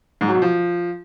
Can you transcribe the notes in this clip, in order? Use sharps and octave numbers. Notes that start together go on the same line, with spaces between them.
G#2
F#3
B2
F3